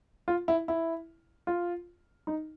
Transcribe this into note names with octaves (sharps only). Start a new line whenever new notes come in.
F4
E4
E4
F4
D#4